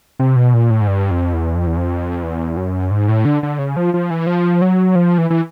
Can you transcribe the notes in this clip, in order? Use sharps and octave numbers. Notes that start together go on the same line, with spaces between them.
C3
B2
A#2
A2
G#2
G2
F2
E2
F2
E2
F2
E2
F#2
G#2
A2
D3
D3
C#3
F3
F3
E3
F3
F#3
F3
E3
E3